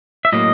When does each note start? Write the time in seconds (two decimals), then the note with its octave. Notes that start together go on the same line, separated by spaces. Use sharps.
0.25 E5
0.32 A2 F#3 A#3 D#5